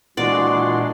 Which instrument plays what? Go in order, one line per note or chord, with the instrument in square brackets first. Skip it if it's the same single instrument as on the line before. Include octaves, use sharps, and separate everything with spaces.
[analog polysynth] A#2 [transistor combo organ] E3 F#5 C6 [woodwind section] G#3 D4 F#4 [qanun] D5